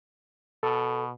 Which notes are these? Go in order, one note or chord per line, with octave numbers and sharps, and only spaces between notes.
B2 A4